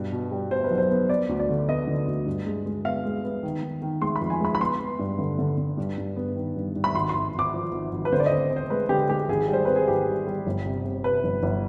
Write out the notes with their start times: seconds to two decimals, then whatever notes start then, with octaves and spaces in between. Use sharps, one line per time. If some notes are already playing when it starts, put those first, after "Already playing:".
Already playing: G2 B2
0.12 B2
0.31 G3
0.51 B3 C5
0.64 B4
0.71 B1
0.78 C5
0.91 B3
1.09 B3 D5
1.29 D2
1.39 D5
1.49 D3
1.69 B3 D#5
1.87 D3
2.08 D2
2.26 G2
2.46 G#3
2.66 G#3
2.85 B3 F5
3.05 G#3
3.25 B3
3.43 D#3
3.63 D#3
3.82 D#3
4.02 G#3 C6
4.16 B5
4.21 F2
4.30 G#5
4.41 G#3 B5
4.55 B5
4.60 B3 C6
4.81 B3
4.99 G2
5.19 D3
5.39 D3
5.58 D3
5.77 G2
5.98 G2
6.16 B3
6.36 D#3
6.56 G2
6.76 G2
6.84 B5
6.94 G#1 C6
7.09 C6
7.14 G#1
7.34 G#1 D6
7.54 F3
7.72 G#1
7.92 G#1
8.05 B4
8.12 D3 C5
8.20 D5
8.26 D#5
8.32 C4
8.51 C4
8.56 C5
8.70 G#3 B4
8.89 D3 G4
9.09 G#3 G4
9.28 G#1 G#4
9.48 G3 C5
9.65 C4 B4
9.76 G#4
9.88 G#1 G4
10.07 G3
10.27 G3
10.46 G1
10.66 C3
10.85 C3
11.04 C3 B4
11.24 G1
11.43 G1